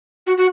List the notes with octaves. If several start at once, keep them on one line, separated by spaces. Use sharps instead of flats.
F#4
F#4